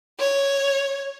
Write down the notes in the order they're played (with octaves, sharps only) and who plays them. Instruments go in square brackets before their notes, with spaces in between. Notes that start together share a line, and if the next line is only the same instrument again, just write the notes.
[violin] C#5